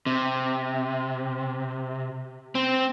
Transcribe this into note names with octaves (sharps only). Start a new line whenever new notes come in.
C3
C4